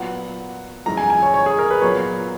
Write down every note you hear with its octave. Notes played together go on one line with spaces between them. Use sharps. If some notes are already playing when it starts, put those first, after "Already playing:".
Already playing: A#2 F#3 B3 F#5
F#2 E3 G#3 D#4 A#5
G#5
G#5
C#5
C#5
G#4
A#4
B4
A#2 F#3 B3 C#5